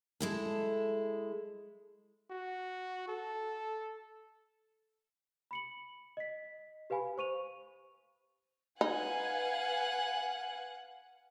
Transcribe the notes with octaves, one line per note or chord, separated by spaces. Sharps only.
G#3 E4 A4
F#4
A4
B5 C#7 F#7
D#5 B6
G4 B4 F5 G#5 B5
C5 C#6 D#7 F7
D#4 B4 F5 F#5 G#5